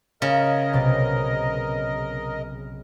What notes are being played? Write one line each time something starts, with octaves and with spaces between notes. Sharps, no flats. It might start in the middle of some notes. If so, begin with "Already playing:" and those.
C#3 A#4 D#5
B1 C3 A6